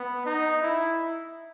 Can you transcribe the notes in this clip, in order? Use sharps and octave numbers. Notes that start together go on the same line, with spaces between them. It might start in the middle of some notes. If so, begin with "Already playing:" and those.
Already playing: B3
D#4
E4